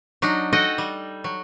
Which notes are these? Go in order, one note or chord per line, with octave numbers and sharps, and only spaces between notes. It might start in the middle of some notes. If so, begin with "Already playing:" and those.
F#3 D4 D#4
F#4 A4 D#5 F#5 G5
G3
F#3